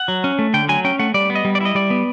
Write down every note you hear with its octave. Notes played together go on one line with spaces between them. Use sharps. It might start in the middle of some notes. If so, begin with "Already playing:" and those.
Already playing: F#5
F#3
C#4
A3
D3 G5
F#3 G#5
C#4 G5
A3 F#5
G3 D5
B3
D#5
G3
D5
E4 D#5
G3 D5
B3